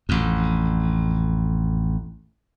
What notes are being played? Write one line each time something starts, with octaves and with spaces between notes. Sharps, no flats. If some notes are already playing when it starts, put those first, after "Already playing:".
A1 F2